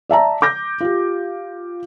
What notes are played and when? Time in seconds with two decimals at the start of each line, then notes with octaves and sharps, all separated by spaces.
0.09 D5 E5 A5 A#5
0.42 D6 G6 A#6
0.81 F4 G4